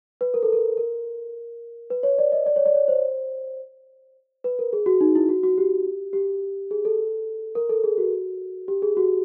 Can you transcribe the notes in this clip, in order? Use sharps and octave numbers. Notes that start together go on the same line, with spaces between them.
B4
A#4
A4
A#4
A#4
B4
C#5
D5
D#5
D5
C#5
D5
C#5
C5
B4
A#4
G#4
F#4
D#4
E4
F#4
F#4
G4
G4
G#4
A4
A#4
A4
G#4
F#4
G4
G#4
F#4